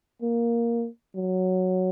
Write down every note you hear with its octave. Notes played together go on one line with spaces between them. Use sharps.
A#3
F#3